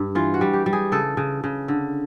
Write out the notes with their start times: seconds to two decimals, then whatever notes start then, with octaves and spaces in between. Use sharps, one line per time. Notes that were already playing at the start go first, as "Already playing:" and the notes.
Already playing: G2
0.15 E3 F4
0.34 F#4
0.41 G3
0.53 G4
0.66 G3
0.73 G#4
0.92 C#3 A4
1.17 C#3
1.44 C#3
1.68 D3